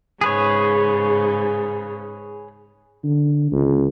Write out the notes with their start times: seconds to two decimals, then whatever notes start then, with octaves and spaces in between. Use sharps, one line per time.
0.21 G#2 C#3 G#4 B4 C#5
3.04 D3
3.52 C#2